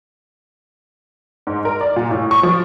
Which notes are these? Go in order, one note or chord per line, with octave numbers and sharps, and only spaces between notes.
G#2
A#4
D5
A#2
A2
C#6
F3